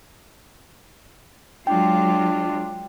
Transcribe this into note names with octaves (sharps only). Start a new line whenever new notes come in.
F#3 G#3 D4 F4 G5